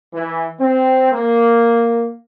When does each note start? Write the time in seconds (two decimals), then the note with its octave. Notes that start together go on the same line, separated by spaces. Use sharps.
0.14 E3
0.59 C4
1.12 A#3